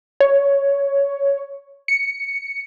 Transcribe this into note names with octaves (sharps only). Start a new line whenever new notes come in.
C#5
C#7